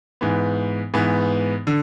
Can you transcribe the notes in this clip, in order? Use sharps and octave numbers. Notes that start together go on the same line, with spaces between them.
G#2 E3 B3
G#2 E3 B3
D3